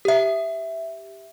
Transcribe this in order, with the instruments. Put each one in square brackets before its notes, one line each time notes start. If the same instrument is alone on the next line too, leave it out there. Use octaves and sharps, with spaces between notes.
[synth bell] G4 E5